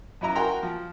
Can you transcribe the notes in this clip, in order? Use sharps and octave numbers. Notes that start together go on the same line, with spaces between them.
F#2 F#3 E4 D#5 E5 A#5
F#4 A#4 G5 G#5 A#5 C6
F3